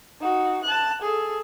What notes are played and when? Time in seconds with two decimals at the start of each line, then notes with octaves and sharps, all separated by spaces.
0.21 D#4 F#4
0.64 A5 F#6
1.02 G#4 A4